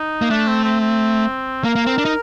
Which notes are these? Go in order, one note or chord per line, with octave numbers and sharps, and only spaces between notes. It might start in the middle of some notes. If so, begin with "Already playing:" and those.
Already playing: D#4
A#3
A3 D4
C4
C4
C4
A#3 A#4
A#3
C4
D4
D#4